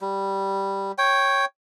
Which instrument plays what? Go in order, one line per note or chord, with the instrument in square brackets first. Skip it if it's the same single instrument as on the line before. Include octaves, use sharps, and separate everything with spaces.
[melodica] G3
C#5 G5